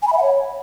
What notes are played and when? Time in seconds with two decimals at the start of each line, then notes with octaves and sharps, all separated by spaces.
0.02 G#5
0.07 B5
0.13 E5
0.18 F#5
0.23 C#5